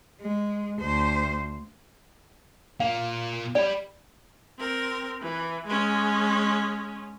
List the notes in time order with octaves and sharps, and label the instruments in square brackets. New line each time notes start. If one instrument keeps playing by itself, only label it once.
[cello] G#3
D2 C5
[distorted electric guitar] A#2 A#3 [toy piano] F5
[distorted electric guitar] G4 B5 [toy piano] D5
[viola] C4 A#4
E3
G#3 C#4